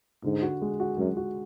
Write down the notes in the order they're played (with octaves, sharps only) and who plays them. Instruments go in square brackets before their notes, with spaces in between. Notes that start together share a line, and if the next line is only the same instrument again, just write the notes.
[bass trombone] G#2 [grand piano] D3
[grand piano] F#4
G#3
F#4
[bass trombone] F#2 [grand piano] G#3
[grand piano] F#4